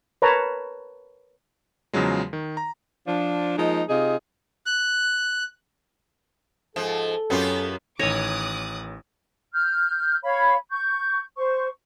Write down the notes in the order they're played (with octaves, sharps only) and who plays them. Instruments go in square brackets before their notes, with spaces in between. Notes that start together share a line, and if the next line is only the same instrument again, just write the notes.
[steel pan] A#4 B4 C#5 A5 A#5
[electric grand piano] E2 C#3 F3 F#3 G#3
D#3
A#5
[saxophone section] F3 D4
F3 G#3 A#3 D#4
C3 D#4 F4 G#4
[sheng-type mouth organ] F#6
[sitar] G#2 F3 [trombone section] A4
[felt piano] F#2 C#4 [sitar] B3 F4 G4
[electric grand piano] A1 D#3 A#6 [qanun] C#5 G#5 [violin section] D6 D#6 F#6
[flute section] F6 G6
C#5 F5 B5
C#6 G6
C5 C#6